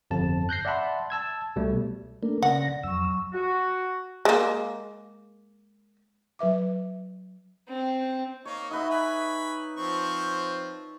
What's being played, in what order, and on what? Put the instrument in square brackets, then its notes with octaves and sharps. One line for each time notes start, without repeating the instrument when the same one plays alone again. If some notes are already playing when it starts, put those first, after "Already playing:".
[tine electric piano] G1 F2 A5
F#6 G6 A#6 C7
D5 E5 F#5 A5 B5 C6
A5 E6 G#6
C2 B2 G3 A3
[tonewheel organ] A3 A#3 D4 [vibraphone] A#4
[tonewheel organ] C#3 A#6 [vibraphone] D5 [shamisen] F#5
[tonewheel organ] F2 E6 [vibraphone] F#3 C#6
[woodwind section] F#4
[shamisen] G#3 A#3
[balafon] F#3 B4 E5 D6
[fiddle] C4
[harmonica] A#3 D#4 [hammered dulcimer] C#5
[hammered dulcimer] D#4 B4 E5 [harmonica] F#4 D#5
[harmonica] G#5 B5
F3 C4 C#6